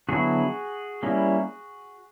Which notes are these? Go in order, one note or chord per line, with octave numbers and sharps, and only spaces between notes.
D3 F#3 B3 E4 F#4 G#4
G3 A#3 C#4 E4